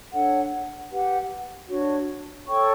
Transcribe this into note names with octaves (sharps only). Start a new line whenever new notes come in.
D4 A4 C#5 F#5
G4 B4 F#5
D4 F#4 C#5
A4 C#5 G5 C#6